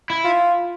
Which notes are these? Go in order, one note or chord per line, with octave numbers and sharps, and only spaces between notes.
E4
F4